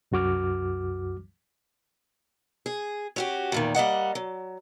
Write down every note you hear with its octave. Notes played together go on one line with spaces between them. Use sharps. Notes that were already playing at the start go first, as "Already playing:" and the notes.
C2 F#2 F#4 D6 F6
G#4
C#4 F#4 G4
E2 A#2 D#3
G3 A#3 D#5 F#5
F#3